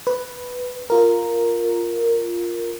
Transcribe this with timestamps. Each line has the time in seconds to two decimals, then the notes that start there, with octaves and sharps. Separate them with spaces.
0.07 B4
0.90 F4 A#4